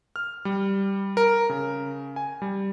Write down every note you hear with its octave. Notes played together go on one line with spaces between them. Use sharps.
F6
G3
A#4
C#3
G#5
G3